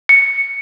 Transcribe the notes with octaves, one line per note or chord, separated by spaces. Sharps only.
C#7